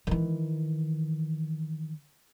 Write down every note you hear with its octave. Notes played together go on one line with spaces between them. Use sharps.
D#3 E3